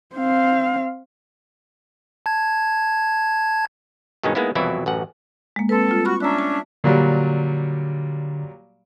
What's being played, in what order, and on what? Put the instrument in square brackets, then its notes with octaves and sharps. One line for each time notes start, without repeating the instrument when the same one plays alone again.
[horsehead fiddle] C4 F5
[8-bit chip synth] A5 G#6
[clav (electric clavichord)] G2 B2 D#3 G#3 C#4 D#4
G#3 A#3 B3 D#4 E4
C2 F2 B2 E3 F#3 E4
A1 F#2 F#5
[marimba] G#3 A#3
[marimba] C4 B4 [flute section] A4
[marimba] G3 F4
[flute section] F#4 C#6 [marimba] B5 F6 F#6
[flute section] C#4 D4 E5 [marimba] A#5 F#6
[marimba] A5
[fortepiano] A#2 F#3 G3 [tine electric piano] D3